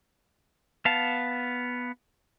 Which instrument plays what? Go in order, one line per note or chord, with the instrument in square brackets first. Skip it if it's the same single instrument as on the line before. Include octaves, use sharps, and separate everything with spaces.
[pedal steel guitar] B3 F5 A5